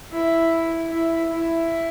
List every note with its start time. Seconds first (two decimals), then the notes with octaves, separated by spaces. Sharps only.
0.12 E4
0.91 E4
1.31 E4